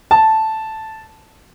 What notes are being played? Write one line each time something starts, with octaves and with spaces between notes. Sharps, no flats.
A5